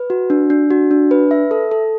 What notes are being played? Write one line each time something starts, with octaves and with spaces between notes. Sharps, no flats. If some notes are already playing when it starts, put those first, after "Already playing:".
Already playing: B4
F#4
D4
D4
F#4
D4
B4
E5
A4
A4